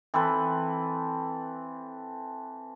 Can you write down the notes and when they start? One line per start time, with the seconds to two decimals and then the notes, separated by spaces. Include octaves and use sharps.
0.14 E3 C4 A4 B4